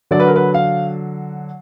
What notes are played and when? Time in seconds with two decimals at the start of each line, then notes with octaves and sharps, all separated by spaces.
0.11 D3 F#3 D5
0.20 B4
0.27 A#4
0.36 B4
0.54 F5